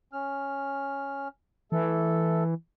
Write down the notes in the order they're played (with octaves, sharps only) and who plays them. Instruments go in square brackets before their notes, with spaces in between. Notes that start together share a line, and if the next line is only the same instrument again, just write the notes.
[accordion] C#4 F6
[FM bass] E3 [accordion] A3 A4